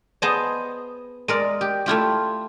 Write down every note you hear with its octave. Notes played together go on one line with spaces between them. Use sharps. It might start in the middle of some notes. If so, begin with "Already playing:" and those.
B3 G#4 C5 D#5 A5
G#3 A#4 D5
G4
A3 E4 F4 G4